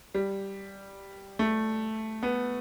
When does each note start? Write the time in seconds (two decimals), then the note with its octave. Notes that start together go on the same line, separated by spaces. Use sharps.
0.14 G3
1.39 A3
2.23 B3